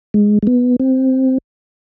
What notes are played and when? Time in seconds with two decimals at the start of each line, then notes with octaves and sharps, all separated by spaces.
0.14 G#3
0.43 G#3
0.47 B3
0.80 C4